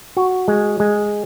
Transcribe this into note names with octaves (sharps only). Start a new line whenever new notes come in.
F#4
G#3
G#3